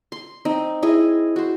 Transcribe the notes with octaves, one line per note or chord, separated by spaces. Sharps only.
C6
C4 D#4
E4 G#4 D#5
F#4 C5